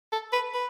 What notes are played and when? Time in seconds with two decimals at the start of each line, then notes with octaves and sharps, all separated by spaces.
0.12 A4
0.33 B4
0.54 B4